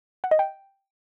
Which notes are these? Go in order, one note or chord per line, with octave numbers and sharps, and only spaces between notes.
F#5
D#5
G5